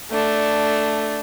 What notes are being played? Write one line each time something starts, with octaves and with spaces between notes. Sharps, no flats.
A3 D4